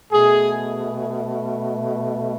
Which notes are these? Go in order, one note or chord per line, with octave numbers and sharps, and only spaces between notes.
B2 A3 G#4